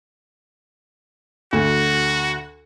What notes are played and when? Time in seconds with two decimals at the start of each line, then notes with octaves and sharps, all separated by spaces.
1.53 D2 F#4